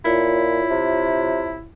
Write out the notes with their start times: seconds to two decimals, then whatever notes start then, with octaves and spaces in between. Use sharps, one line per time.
0.05 A#2 E4 F4 C#5
0.71 C3